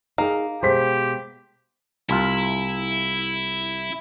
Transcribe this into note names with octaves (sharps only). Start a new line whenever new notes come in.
A#3 D#4 G#4
B2 G#3 G4 C5 B6
C2 E4 F4